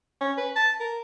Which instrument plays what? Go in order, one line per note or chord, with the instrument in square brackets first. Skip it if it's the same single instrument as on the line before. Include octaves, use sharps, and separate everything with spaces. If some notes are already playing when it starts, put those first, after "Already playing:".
[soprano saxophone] C#4
B4
A5
A#4